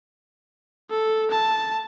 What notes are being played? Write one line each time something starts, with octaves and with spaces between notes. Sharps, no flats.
A4
A5